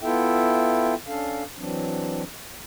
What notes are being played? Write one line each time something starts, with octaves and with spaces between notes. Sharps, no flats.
B3 E4 F4 A4 E5 G5
C#4 D4 A4 F5
E3 F#3 C4 D4